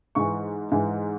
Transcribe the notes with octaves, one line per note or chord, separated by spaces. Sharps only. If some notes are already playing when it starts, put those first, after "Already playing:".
G#2 E3 C#6
G#2 E3